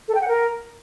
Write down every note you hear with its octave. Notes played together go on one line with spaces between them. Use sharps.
A4
G5
F#5
A#4